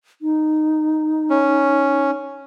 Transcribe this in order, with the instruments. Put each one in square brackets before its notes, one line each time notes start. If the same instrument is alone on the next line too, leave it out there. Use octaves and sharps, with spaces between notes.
[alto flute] D#4
[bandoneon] C#4